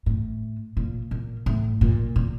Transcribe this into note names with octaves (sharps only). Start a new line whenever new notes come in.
A2
A#2
A#2
A2
A#2
A#2